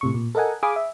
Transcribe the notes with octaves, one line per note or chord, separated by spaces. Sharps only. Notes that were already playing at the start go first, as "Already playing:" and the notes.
A2 C3 C#6
A#2
A4 A#4 D#5 F#5 G#5
G#4 F5 G#5 B5 D6 D#6
E5